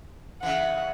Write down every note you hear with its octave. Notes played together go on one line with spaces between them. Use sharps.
C#3 E3 F#5